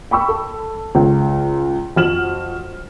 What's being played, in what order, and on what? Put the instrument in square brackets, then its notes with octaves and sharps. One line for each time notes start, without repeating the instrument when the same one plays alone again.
[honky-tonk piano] G5 B5 C#6 E6
A4
C#2
F2 F#4 F6 E7 F#7